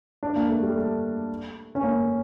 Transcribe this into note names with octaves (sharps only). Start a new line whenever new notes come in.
D4
A#3
A3
G3
A3
C#4
A#3